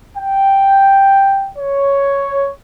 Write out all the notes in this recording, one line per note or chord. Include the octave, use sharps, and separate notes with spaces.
G5
C#5